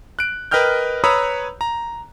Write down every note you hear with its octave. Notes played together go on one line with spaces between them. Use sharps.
F#6 D7
A#4 B4 D#5 G5 F6 G6
B4 C#5 A#5 B5 D#6 E6
A#5